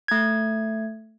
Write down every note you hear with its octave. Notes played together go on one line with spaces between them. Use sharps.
A3 G#6